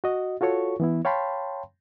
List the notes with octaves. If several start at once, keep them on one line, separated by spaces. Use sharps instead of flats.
F#4 D#5
F4 F#4 A4 C#5 C#6
E3 B3 E4
C#5 F5 G5 A5 B5 C6